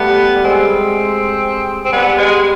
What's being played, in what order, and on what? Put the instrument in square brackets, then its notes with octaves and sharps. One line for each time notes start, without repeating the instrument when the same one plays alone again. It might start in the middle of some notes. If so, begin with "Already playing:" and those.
Already playing: [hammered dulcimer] G3 A3 [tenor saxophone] B3
[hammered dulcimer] G3
[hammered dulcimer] G#3 [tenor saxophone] C4
[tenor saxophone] C4
[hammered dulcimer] G3 [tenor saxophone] B3
[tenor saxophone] G#3